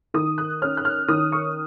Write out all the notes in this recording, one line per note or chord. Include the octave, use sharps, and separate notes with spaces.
D#3 D#6
F#6
C#4 F6
F#6
F6
D#3 D#6
C#6